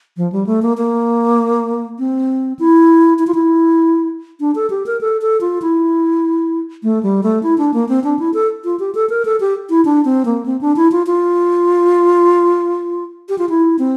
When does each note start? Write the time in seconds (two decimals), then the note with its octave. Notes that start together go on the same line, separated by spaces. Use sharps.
0.17 F3
0.32 G3
0.47 A3
0.62 A#3
0.77 A#3
1.99 C4
2.59 E4
3.19 E4
3.27 F4
3.34 E4
4.40 D4
4.55 A4
4.70 G4
4.86 A#4
5.01 A4
5.22 A4
5.41 F4
5.62 E4
6.83 A3
7.03 G3
7.23 A3
7.43 E4
7.58 D4
7.74 A#3
7.89 C4
8.04 D4
8.19 E4
8.34 A4
8.65 F4
8.79 G4
8.95 A4
9.09 A#4
9.25 A4
9.40 G4
9.70 E4
9.85 D4
10.05 C4
10.25 A#3
10.46 C4
10.61 D4
10.76 E4
10.92 F4
11.07 F4
13.29 G4
13.38 F4
13.49 E4
13.79 C4